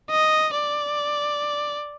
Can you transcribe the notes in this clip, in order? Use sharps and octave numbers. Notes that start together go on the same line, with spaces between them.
D#5
D5